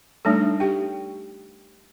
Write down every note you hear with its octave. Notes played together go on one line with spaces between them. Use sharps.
G3 A3 D4 D#4 A4
G4 G5